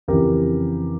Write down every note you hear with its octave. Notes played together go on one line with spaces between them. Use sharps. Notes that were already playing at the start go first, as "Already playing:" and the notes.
F2 C#3 E3 G4 A#4